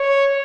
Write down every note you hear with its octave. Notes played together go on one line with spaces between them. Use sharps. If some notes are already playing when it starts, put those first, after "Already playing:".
Already playing: C#5